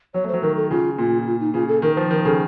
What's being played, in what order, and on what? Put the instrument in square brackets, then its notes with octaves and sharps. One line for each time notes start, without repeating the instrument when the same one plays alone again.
[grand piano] F#3 [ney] C#5
[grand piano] A3
[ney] C5
[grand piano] F#3
[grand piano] D#3 [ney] A#4
[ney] A4
[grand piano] C#3 [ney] F4
[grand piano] A#2 [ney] F4
[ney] F4
D#4
[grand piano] C#3 [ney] F4
[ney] A4
[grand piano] D#3 [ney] A#4
[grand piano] F3 [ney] C5
[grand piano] D#3 [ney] A#4
[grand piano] C#3 [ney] A4